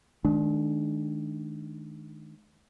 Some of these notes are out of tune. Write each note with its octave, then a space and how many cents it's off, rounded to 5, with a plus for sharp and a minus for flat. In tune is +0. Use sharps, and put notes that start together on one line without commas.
D#3 +0 G#3 +45 D4 +0